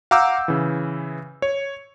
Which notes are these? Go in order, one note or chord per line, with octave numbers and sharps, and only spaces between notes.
F5 F#5 A#5 D6 E6 G6
C#3 E3
C#5